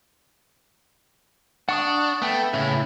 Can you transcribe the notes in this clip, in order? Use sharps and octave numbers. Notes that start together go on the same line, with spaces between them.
D4 F#5 C#6 D#6
A3 B3 G5
A2 C#3 E4